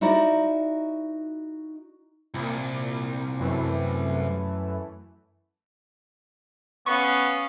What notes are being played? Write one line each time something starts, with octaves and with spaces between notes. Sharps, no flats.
D#4 E4 F#4 A#4 D5 D#5
C2 A#2
F#2 E3 A3
B3 C#4 F5 C#6